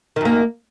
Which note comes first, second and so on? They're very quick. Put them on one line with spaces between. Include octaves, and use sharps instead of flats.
D#3 F#2 A#3